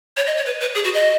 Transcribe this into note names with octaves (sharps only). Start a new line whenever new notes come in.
C#5
D#5
C#5
B4
B4
G#4
F#4
D#5